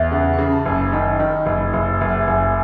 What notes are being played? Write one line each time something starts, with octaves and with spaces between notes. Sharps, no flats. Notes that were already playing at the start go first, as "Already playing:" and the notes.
Already playing: E2 C#5 E5
C#3 F#5
C#6
C#3 B5
A5
F#1
C#6
D#3 B5
D#3 B5
C#6
F#1 B5
F#1 B5
E5
F#1
F#5
G#5
F#1
G#5